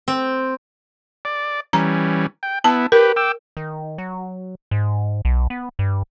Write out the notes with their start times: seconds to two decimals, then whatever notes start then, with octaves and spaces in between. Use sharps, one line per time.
0.08 C4
1.25 D5
1.73 E3 G3 C#4 A#5
2.43 G5
2.64 B3 E4 A5
2.92 G4 A#4 B4
3.16 G5 D6 E6
3.57 D#3
3.98 F#3
4.71 G#2
5.25 B1
5.50 B3
5.79 G2